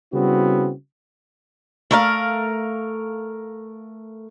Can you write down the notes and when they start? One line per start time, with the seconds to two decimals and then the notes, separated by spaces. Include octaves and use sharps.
0.12 C#3 G3 B3 C4 E4 F#4
1.91 A3 A#4 F5